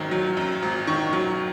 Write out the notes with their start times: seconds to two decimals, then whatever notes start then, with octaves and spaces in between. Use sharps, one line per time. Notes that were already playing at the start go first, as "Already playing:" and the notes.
Already playing: G#1 F#2 D#3
0.11 F#3
0.37 F#2
0.62 G#1
0.87 D#3 C#6
1.13 F#3